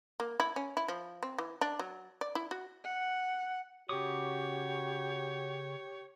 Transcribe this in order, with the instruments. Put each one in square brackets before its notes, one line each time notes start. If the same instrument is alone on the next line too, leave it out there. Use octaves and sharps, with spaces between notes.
[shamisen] A#3
E4
C#4
E4
F3
C4
E3
D4
F#3
D5
E4
F#4
[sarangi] F#5
[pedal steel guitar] C#3 D6 D#6 [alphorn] F#4 [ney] G4 [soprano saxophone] C#5